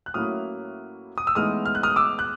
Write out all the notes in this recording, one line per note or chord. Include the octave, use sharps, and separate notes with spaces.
F#6
A2 F#3 A#3 C#4 E4 D#6 F6
D#6
E6
A2 E3 G#3 B3 D#4 D#6 F6
F6
F#6
D#6 F6
D6 E6
F#6